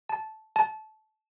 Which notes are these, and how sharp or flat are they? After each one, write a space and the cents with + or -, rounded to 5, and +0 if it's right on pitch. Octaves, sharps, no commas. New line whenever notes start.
A5 -10
A5 -20